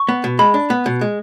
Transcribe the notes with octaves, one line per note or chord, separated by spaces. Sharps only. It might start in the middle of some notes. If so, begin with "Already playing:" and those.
Already playing: C#6
B3
B2
G#3 B5
D4
B3
B2
G#3